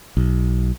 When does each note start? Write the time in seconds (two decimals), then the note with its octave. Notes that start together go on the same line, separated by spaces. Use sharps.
0.17 B1